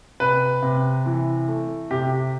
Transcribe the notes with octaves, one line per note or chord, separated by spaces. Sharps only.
C3 B4
C3
E3
A3
C3 G4